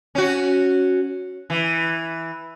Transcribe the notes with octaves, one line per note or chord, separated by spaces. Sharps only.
C#4 F#4
E3